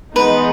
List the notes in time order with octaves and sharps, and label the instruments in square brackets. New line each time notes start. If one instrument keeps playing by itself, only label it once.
[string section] E3 G#3 B3 D#4 [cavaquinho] B4